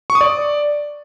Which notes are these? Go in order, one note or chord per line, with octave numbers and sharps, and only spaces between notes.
C#6
D#6
D5